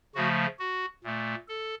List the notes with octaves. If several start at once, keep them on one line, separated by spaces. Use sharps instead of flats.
C#3 F3 A3 F#4
F#4
A#2 A3
A4